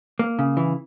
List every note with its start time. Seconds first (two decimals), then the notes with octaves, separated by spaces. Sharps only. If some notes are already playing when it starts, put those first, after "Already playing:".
0.19 A#3
0.39 C#3
0.57 E3